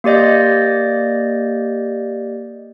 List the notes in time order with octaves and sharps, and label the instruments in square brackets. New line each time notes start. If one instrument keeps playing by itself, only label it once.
[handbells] A#3 G4 D5 D#5 G6